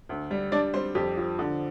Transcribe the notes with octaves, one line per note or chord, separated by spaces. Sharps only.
D2
G3
G3 D4 D5
G3 C4 C5
F2 G4
F3
D3